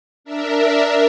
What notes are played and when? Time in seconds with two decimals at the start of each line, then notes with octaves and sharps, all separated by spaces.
0.24 D4 A#4 E5